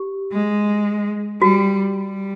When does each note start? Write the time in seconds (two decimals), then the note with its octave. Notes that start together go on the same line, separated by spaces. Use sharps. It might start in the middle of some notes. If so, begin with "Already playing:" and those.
Already playing: G4
0.32 G#3
1.41 G3 F#4
1.95 G3